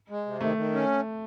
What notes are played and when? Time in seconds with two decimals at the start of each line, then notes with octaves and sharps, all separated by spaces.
0.10 G#3
0.26 C3
0.41 D#3 A3
0.57 D#3
0.73 C#4